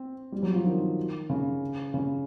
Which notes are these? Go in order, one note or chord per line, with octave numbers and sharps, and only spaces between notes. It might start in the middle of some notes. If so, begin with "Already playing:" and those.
Already playing: C4
G3
F#3
F3
D#3
C#3
C#3